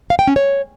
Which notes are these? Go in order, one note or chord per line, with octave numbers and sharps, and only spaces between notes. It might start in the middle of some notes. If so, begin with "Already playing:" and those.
F5
G5
C#4
C#5